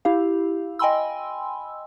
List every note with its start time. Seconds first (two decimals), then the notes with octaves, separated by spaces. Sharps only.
0.05 E4 G4 F5
0.79 D#5 G5 G#5 B5 C6 E6